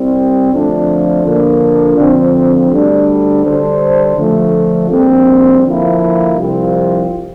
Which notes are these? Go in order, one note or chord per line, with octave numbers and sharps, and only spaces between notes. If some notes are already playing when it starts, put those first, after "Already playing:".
Already playing: C2 C3 G3 C4
F2 D3 F3 A3 D4
D3 F3 A#3 D4
D3 F3 C4
D2 D3 G3 D4
D3 G3 D4 A4 C5
D3 F3 A3
A#1 A#2 G3 C4
D3 F3 A#3 E4
C2 C3 F3 C4 F4